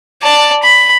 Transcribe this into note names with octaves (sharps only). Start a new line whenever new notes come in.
D5 A5
B5